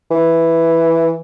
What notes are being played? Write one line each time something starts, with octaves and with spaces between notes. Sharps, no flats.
E3